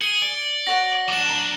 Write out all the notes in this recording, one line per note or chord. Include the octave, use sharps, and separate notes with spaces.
G#4 C#7 G7
D5
F#4 C#5 F#5 A#6
F#3 D4 D6 E7
A5 A#5